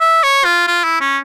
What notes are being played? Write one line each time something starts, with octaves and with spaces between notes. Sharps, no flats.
E5
C#5
F4
F4
E4
C#4